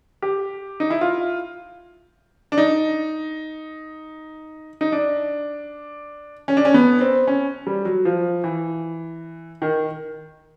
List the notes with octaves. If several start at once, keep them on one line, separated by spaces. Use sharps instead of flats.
G4
D#4
E4
F4
D4
D#4
D#4
D4
C#4
D4
C#4
B3
C4
C#4
G3
F#3
F3
E3
D#3